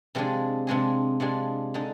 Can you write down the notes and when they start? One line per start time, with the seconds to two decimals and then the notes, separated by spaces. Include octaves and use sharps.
0.15 C3 F3 G#3 D4 G#4
0.67 C3 F3 G#3 D4 G#4
1.20 C3 F3 G#3 D4 G#4
1.74 D3 G#3 D#4